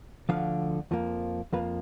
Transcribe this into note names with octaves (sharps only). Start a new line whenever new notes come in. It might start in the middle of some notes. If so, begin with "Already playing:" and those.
D2 D3 F3 F5
F2 F3 A#3
F2 F3 A#3 B4